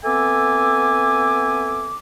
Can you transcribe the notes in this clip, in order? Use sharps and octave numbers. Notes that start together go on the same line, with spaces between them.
B3 C4 A4 E5 G#5 D6